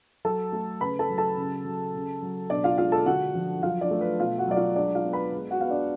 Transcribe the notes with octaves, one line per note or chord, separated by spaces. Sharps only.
F#3 A4 A5
A3
C#3 B4 B5
A4 A5
F#3
A4 A5
C#3
F#3
C#3
F#3
B2 D4 D5
F4 F5
G#3 F4 F5
A4 A5
D3 F#4 F#5
F3
F#3 F4 F5
D4 D5
A3
B4
B2 F4 F5
F#4 F#5
F#3 D5
F4 F5
G#3 D4 D5
F4 F5
B3
B4 B5
G#3
F#4 F#5
B3 F5
D4 D5